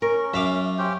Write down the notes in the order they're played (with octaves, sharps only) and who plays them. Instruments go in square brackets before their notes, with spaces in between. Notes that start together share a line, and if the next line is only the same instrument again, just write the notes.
[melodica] C#4 [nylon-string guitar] A#4
[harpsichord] F#2 F5 D6 [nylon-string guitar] E5
[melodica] C#4 G4 C5